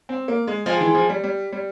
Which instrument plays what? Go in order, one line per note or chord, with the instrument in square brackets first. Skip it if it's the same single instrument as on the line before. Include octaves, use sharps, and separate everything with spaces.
[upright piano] C4
A#3
G#3
[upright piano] F3 [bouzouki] G#3 C4 F4 G#4
[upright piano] E3
F3
G3
G3
G3